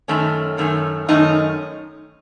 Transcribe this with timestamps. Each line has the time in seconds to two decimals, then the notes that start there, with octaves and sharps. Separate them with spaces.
0.08 F#2 D#3 A3 C#4
0.58 F#2 D#3 A3 C#4
1.08 F#2 D#3 A3 C#4 D#4